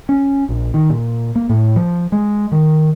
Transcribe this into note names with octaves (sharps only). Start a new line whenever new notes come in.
C#4
A#1
D#3
A#2
A#3
A2
F3
G#3
D#3